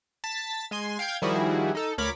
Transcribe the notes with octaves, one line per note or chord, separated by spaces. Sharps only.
A5 A6 B6
G#3 G#5 C6
F5 G5 G6 G#6
D#3 F3 G3 E4 F#4 G#4
D#4 A4
D2 A#4 C#5 B5 D6 B6